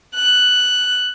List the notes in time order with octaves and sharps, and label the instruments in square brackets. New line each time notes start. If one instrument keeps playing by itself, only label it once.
[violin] F#6